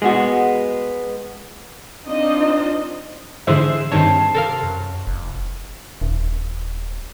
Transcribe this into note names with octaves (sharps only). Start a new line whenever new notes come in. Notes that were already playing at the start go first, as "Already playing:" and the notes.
G#3 B3 F#4
C4 D4 D#4 F4 C5 D#5
G#2 D3 E3 G#4 C5 E5
G2 D#3 C4 C5 C#5 A5
C3 A4 A#4 F5
F#2
F1
D#1